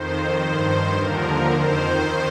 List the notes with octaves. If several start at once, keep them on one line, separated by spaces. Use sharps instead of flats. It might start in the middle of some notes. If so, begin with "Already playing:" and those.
Already playing: F2 D#3 C5
G2 D#3
D#2 D3 F3 A#4
F2 D#3 C5